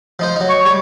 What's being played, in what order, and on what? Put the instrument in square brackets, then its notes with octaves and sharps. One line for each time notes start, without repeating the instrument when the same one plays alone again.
[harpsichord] F3 D#4 C5
F#3 D#4
[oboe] C#6
[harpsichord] G3 [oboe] C#5